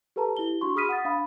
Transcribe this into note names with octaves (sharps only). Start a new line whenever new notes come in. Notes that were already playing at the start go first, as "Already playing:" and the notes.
G4 A4 B4 A5 A#5
E4 G4 G7
D4 F#4 C6 C#6
G#4 B5 D#6 F6 B6 D#7
F#5 D#6 A6
D4 F5 B5